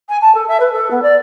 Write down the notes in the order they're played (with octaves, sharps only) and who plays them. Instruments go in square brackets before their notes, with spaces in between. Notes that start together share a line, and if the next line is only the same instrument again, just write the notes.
[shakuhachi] G#5
A5
A4
E5
B4
A4
B3
D5